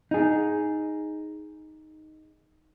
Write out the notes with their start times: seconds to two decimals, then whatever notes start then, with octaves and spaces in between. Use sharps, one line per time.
0.11 D#4 G#4